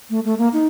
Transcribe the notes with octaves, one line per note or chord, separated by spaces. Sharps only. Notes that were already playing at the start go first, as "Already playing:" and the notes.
A3
A3
A#3
D#4